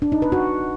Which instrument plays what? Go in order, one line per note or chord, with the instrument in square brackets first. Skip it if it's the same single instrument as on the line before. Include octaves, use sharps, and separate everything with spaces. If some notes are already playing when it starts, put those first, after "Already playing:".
[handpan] D4
D#4
B4
F#4